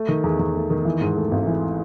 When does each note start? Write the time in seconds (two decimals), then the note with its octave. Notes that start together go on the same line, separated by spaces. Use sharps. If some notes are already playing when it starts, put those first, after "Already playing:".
Already playing: A3
0.09 D#3
0.24 E2
0.39 E2
0.55 A3
0.70 D#3
0.85 E3
1.01 G#2
1.16 A3
1.31 G#1
1.47 E3